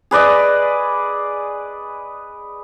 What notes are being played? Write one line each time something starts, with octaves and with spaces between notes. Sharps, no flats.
G#4 B4 D5 D#5